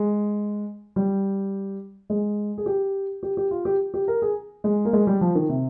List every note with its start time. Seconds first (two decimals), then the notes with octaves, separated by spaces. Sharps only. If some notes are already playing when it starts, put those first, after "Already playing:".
Already playing: G#3
0.96 G3
2.10 G#3
2.58 G#4
2.66 G4
3.23 G4
3.37 G4
3.51 F4
3.65 G4
3.94 G4
4.08 A#4
4.22 G#4
4.64 G#3
4.85 A#3
4.93 G#3
5.07 G3
5.21 F3
5.35 D#3
5.49 C3